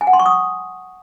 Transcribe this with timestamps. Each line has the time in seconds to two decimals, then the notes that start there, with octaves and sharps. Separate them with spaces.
0.01 G#5
0.07 F#5
0.13 C6
0.20 C#6
0.26 D#6